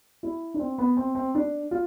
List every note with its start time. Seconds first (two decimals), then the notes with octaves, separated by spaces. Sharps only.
0.23 E4
0.54 D4
0.60 C4
0.78 B3
0.97 C4
1.15 C4
1.35 D4
1.71 F4